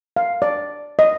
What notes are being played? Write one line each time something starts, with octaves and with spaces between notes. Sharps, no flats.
F5
D5
D#5